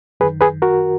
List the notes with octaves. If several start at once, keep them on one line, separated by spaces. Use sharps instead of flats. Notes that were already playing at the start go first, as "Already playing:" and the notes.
F#2 D#3 G#4 B4
G#4 B4
F#4 A#4